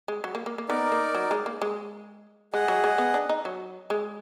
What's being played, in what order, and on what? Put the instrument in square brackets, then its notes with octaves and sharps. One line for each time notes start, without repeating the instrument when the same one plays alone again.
[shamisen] G#3
F#3
A#3
A#3
A#3
[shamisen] B3 [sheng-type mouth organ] D#4 A#4 D5
[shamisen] A#3
F#3
G#3
A#3
G#3
[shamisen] G#3 [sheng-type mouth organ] G#4 D#5 F#5
[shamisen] F#3
G#3
B3
D4
D#4
F#3
G#3